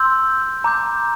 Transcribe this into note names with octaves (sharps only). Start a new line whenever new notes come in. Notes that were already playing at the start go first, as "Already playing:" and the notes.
Already playing: C6 E6 G6
A#5 D6 G6